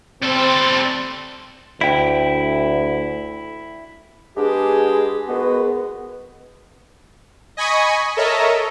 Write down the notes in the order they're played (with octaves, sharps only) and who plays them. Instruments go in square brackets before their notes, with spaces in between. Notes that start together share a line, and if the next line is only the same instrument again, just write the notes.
[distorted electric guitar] G3 A4 [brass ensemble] C4
[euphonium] D2 [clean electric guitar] E4 G5
[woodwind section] G#3 B3 D4 G4 G#4
D#3 G#3 B3 F#4 B4
[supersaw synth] D#5 G#5 B5 C#6 D#6
A4 A#4 C#5 D#5 E5